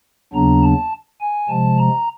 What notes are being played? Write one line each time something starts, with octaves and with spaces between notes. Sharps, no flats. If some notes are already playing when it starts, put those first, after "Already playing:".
D#2 C#3 F#3 B3 D4 A#5
A5
G#5
C3 F3 G#3 A5
A#5